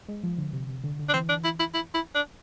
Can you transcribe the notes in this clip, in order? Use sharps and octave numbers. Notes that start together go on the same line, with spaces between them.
G#3
F3
D3
C3
C3
D3
D3
D4
E3 C4
D4
E4
E4
E4
E4
D4